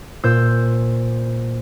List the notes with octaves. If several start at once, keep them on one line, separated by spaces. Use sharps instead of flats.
A#2 C5 E6 G6